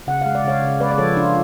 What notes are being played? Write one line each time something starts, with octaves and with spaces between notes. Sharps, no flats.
C#3 F#5
G#3 F5
D5
C#3 C#5 F5
C#3
G#3 B4 D5
D5
F3 A4 C#5
D4 F4